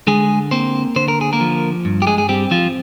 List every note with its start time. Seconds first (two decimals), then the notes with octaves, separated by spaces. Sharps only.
0.07 D3 G#3 G#4
0.51 A#3 C4 C5
0.96 D3 C5
1.08 A#4
1.21 G#4
1.33 A#3 A#4
1.41 F3
1.85 G2
2.02 G4
2.07 G#3 G#4
2.18 G#4
2.29 G3 C4 G4
2.51 F3 F4